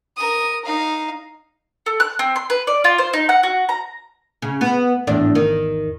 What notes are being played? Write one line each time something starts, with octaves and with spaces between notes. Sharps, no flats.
A#4 D#6
D#4 F5
A4
F#6
C4
C6
B4
D5
F4
C5
D#4
F#5
F#4
A#5
C#3
B3
G#1 E2 A2 D4
D#3